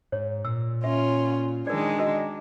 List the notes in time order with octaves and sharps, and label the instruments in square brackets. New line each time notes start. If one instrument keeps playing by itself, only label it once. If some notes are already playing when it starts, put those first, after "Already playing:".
[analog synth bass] G#2 [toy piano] C#5
[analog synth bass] A#2 [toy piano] E6
[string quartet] C#4 F4 [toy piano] E5
[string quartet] D#3 G#3 D4 [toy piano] A#4 D5
[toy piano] F#4 A#4 D#5